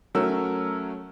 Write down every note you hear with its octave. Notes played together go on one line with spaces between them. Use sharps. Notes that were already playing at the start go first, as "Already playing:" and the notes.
F#3 A3 C#4 A#4 E6